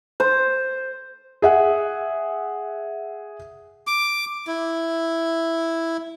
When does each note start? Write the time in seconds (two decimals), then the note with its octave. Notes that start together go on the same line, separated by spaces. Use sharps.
0.20 C5
1.42 G#4 E5 F#5
3.87 D6
4.47 E4